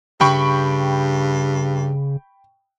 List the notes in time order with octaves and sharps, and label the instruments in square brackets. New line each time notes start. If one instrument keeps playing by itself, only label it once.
[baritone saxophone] G2 [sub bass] C#3 [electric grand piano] G5 B5 C#6